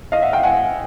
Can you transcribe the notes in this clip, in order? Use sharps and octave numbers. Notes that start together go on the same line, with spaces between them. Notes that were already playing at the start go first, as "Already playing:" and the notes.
D#5 F5
E5 F#5
F5 G5
F#5 G#5